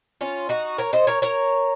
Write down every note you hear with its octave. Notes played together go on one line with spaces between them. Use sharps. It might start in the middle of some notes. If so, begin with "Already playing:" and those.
C#4 F4
D#4 F#4
A#4 C#5
C5 D#5
A#4 C#5
A#4 C#5